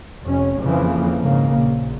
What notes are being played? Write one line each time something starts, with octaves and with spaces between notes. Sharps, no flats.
F1 C#4
F2 C#3 E3 F3 A#3
G#2 C#3 A#3
A#1